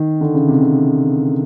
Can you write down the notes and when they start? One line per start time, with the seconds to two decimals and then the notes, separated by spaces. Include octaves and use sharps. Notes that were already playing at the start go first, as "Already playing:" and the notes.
Already playing: D#3
0.21 D3
0.35 C#3
0.48 C3
0.62 C#3